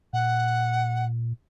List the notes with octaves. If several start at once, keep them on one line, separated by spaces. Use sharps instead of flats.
A#2 F#5